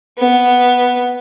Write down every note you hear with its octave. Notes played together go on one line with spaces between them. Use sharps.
B3